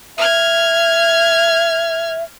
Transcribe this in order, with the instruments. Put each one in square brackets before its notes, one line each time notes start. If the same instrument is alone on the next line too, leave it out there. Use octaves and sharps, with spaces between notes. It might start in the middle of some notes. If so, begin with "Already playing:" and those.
[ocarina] E5 [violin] F6 G#6